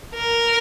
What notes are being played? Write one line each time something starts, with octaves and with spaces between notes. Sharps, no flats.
A#4